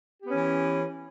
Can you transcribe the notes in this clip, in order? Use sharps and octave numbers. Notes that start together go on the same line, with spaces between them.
E3 B3 C#4 G4